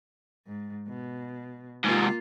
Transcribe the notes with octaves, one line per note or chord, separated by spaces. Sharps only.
G#2
B2
G#2 C3 A#3 F4